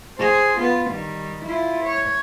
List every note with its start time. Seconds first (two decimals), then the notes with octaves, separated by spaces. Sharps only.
0.19 G#4 C5
0.58 B3 F4
0.91 D#3 G3
1.44 E4 F4
1.84 C#5